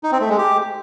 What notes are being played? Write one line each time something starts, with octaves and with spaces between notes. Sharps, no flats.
D#4
C4
A3
G#3
G4